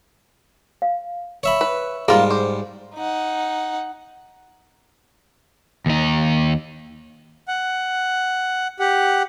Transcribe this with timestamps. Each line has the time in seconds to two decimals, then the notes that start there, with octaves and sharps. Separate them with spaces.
0.82 F5
1.43 C#5 E5 B5
1.61 B4
2.08 G#2 G3 A#3 F4 G#4 C6
2.31 C5 D6
2.95 D#4 F#5
5.86 D#2 D#4
7.48 F#5
8.80 G4 F#5